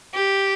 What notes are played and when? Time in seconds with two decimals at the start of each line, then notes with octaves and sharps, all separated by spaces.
0.14 G4